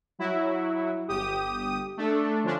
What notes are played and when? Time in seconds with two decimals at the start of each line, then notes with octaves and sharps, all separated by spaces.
0.19 F#3 E4 F#4
1.08 G1 G4 D#6
1.97 A3 D4 A4
2.43 D3 F3 C#4 D4